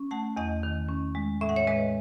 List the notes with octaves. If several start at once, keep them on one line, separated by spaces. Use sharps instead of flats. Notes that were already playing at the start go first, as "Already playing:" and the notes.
Already playing: C#4
A3 F#5 A5
E2 D#5 F#5
D#3
C#4
G#3
A2 E5
F#5
C#5 E5
G#3 B4 D#5